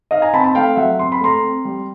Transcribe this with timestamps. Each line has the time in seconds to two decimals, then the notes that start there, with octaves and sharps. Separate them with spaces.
0.11 D#4 D#5 F5
0.22 G#5 A#5
0.33 C4 A5 B5
0.44 A5 B5
0.55 A3 F5 G5
0.76 F#3 E5 F#5
0.99 C4 C6
1.12 B5
1.21 A3 A#5 C6
1.43 C4
1.65 G3